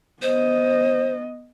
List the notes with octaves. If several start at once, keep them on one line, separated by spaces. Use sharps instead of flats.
B3 C5 D#5